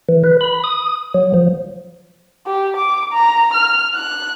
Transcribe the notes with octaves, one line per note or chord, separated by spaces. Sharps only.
E3
B4
B5
D#6
F#3
F3
G4
D6
A#5
F6
F#6